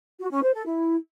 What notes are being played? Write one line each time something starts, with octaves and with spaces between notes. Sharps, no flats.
F#4
C#4
C5
A4
E4